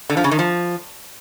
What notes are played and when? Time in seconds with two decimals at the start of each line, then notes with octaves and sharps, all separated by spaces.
0.10 D3
0.17 F3
0.24 C#3
0.31 D#3
0.39 F3